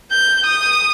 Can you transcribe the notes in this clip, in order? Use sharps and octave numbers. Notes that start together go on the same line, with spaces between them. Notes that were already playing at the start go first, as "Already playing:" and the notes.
G6
D#6